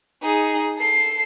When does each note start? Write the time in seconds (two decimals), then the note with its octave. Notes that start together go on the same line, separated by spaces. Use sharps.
0.22 D#4 G#4
0.78 A4 C7